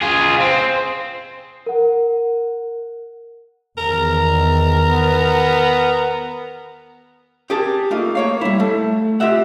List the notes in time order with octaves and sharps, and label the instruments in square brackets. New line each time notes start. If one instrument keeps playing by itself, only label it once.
[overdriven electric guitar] F4 G#4
C4
[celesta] A#4 F#5
[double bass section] E2 D#3 [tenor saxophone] A#4
[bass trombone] B3
[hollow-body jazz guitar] G4 G#4 A#4 A5
A3 A#3 D#4 F4
A#3 C#5 F5
G3 E4
A3
F4 G4 D#5 E5 F#5